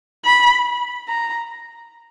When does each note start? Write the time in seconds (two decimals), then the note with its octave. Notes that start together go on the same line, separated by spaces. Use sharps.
0.25 B5
1.08 A#5